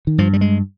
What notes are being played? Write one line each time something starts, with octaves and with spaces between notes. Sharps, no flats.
D#3
G2 F3
G3
G#3